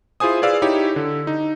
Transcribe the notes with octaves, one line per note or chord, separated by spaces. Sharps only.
E4 F4 G#4 C5 G#5 D#6
G#4 B4 D5 F5 E6
D#4 E4 G4 C#5
D3
D#4